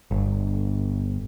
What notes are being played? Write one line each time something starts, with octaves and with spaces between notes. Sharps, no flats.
G1